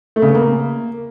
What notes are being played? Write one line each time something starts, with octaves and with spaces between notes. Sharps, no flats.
A3
C#3
B3
A#3